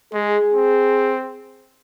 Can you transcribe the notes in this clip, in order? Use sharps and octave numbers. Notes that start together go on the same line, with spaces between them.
G#3 G#4
C4